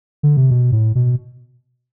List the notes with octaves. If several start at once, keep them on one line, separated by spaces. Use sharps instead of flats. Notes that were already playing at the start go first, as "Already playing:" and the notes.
D3
C3
B2
A2
B2